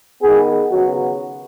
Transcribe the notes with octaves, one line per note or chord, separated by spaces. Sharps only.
D#3 B3 G#4
C#3 F#3 B3 F#4